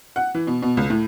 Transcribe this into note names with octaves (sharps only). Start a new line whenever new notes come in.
F#5
E3
B2
B2
C#2
A2